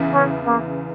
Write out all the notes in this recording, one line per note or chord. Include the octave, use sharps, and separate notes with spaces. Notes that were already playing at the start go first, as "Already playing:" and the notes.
Already playing: E2 C#3 E3 B3 E4
C#4
A#3